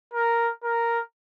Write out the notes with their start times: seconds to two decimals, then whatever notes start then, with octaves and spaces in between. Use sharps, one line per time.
0.13 A#4
0.64 A#4